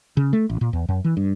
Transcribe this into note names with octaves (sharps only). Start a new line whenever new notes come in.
C#3
A3
A1
A#2
E2
F#2
E3
G2